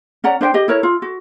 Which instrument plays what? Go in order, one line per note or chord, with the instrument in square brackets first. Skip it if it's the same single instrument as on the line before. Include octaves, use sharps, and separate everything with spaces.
[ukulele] C#4 D5 F#5 A#5
D4 C5 E5 G5
G4 D#5
E4 A#4 C#5
F4
F#4